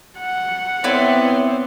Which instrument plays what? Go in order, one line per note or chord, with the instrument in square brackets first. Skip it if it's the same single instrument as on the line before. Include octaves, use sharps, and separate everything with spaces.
[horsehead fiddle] F#5
[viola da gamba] B3 C4 [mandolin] E4 B4 D5 [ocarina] C#5